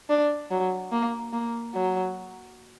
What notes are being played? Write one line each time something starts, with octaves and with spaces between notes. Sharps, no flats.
D4
F#3
A#3
A#3
F#3